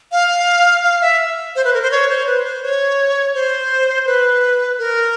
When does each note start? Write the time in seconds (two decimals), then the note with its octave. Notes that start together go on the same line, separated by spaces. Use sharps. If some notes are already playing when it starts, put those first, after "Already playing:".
0.12 F5
0.84 F5
1.01 E5
1.56 C5
1.65 B4
1.74 A#4
1.82 C5
1.91 C#5
2.09 C5
2.27 B4
2.45 C5
2.63 C#5
3.34 C5
4.06 B4
4.79 A#4